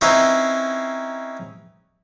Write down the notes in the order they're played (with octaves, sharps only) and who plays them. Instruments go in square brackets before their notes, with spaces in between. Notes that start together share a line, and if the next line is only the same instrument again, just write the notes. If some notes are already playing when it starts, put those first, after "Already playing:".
[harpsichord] C4 C#4 D#4 E4 B4 C5